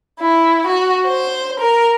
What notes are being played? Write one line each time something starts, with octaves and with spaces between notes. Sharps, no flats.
E4
F#4
C5
A#4